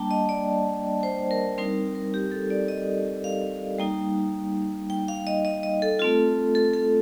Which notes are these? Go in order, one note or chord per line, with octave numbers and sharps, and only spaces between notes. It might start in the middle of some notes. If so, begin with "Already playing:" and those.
Already playing: G3 A#3 D4 G5 A5
D#5
D5
C5
A#4
G3 C4 D#4 A#4
A#4
G4
A4
D5
D#5
F5
G3 A#3 D#4 G5
G5
F5
D#5
D#5
D#5
A4
A3 C4 F4
A4
A4